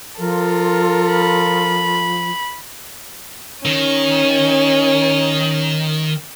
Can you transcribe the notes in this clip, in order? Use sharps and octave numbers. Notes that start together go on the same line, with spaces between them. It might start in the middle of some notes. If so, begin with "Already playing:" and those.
F3 F4 A4 A#4
B5
D#3 C#4